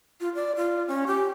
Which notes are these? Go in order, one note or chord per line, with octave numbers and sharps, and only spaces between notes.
F4
D5
F4
C#4
G4